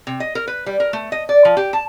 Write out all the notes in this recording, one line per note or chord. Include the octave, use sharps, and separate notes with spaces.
C3
D#5
A#4
B4
G3
A#4
A3
D#5
D5
F3
G4
A5